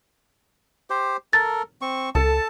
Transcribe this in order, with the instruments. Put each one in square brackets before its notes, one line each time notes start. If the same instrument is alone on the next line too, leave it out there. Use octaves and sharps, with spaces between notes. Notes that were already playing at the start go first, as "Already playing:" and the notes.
[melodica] G4 C5
[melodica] A4 A#4 [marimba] A6
[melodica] C4 C#6
[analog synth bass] C#2 [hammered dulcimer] A4 [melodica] A5